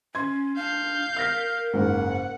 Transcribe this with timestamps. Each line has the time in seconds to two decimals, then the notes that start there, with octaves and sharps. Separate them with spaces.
0.15 C#4 C6 G#6
0.56 D4 F5 G6
1.17 A#4 F6 A#6 B6
1.73 F#1 G#2 F#5